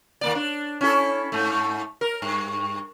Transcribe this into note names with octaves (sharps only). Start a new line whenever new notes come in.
D#2 A#3 D5
D4
C#4 E4 A4
G#2 A3
A#4
G2